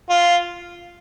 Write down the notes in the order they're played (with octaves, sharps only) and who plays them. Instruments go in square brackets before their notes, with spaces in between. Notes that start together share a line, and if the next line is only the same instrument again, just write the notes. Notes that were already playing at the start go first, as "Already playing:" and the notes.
[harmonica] F4